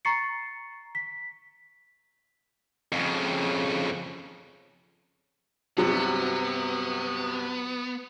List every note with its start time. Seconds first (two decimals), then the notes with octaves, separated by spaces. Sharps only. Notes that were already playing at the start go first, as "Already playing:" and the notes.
0.05 A#5 C#6 A6 C7 C#7
0.95 B6
2.92 F2 C#3
5.78 G2 C3 F#3 B3